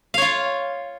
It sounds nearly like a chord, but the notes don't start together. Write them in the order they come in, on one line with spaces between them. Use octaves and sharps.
F5 C#5 F4